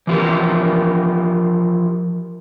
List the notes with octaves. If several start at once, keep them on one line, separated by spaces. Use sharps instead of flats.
E3 F3 G4 A#4